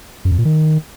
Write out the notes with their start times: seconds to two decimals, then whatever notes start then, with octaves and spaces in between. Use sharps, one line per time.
0.25 F#2
0.32 F2
0.38 A#2
0.45 D#3